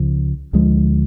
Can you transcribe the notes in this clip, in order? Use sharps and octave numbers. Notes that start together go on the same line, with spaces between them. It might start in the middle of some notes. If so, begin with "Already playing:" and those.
Already playing: C#2 C#3 F3
D2 D3 F3 G#3